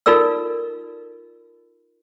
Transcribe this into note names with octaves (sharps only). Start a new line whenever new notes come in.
D#4 F4 A4 A#4 D5 E6